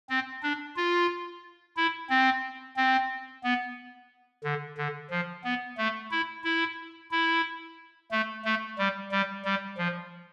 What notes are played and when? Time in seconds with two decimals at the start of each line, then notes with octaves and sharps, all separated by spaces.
0.10 C4
0.43 D4
0.76 F4
1.77 E4
2.10 C4
2.77 C4
3.43 B3
4.44 D3
4.78 D3
5.11 F3
5.44 B3
5.78 A3
6.11 E4
6.44 E4
7.11 E4
8.11 A3
8.45 A3
8.78 G3
9.12 G3
9.45 G3
9.78 F3